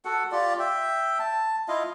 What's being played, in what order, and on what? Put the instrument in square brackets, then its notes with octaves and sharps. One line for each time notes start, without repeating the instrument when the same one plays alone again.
[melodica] F#4 A4 F#5
F4 G4 D5
E5 G5
A5
E4 F4 D#5 F5